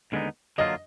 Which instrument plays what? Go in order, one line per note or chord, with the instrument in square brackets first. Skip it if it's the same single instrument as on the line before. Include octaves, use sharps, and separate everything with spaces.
[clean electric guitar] D#2 D3 G#3 B3 D#4
[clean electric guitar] D3 F#3 A#3 F4 [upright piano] D#5